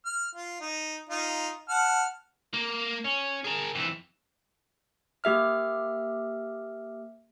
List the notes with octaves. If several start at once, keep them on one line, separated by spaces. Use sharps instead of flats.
F6
F4
D#4
D#4 F4
F#5 A5 F6
A#3
C#4
G#4 A#4
F2 E3
A#3 G4 E5 F6